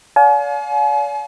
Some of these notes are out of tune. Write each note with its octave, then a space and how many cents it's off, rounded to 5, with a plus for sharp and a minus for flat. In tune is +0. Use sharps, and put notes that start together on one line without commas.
D5 -40 F5 +30 G#5 +40